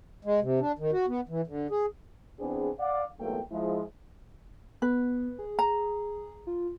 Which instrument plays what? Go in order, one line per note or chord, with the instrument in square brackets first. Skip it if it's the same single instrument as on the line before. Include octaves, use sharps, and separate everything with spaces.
[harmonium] G#3
C3
D4
D#3
F#4
B3
E3
D3
G#4
[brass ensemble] E3 B3 C4 D4 G#4
D5 F5 F#5
B1 E2 G2 A3 A#3 G5
F3 G#3 E4
[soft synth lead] B3 [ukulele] B4
[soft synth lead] G#4
[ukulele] A#5
[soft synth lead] F4